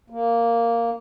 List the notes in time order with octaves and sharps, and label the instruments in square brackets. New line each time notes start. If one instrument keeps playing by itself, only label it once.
[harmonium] A#3